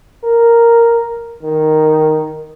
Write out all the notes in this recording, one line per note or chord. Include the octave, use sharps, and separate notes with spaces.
A#4
D#3